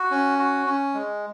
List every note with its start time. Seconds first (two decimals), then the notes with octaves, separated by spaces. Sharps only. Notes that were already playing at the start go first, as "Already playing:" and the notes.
Already playing: F#4
0.11 C#4
0.39 F#4
0.66 C#4
0.94 G#3